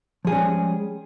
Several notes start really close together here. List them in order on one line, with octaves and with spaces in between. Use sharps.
F3 G#4 G3 C#4 G#3